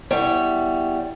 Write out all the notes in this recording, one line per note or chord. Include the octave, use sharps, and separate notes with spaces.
E2 G3 C#5 E5 G5